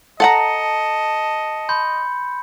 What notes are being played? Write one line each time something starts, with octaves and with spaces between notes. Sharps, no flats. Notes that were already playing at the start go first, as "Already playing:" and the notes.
A4 D#5 F#5 A5 A#5 C#7
B5 C6 G6